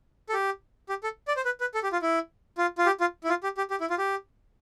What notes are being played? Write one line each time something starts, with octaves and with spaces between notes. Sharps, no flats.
A4
G4
G4
A4
D5
C5
B4
B4
A4
G4
F4
E4
F4
F4
G4
F4
E4
F4
G4
G4
G4
E4
F4
G4